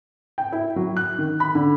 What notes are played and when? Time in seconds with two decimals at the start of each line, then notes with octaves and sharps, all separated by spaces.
0.38 G5
0.52 E4
0.76 F#3
0.97 F#6
1.18 D#3
1.40 B5
1.55 D3